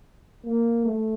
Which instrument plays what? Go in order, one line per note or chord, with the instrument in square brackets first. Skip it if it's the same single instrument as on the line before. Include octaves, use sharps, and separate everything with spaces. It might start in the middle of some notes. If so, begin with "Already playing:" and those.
[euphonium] A#3
A3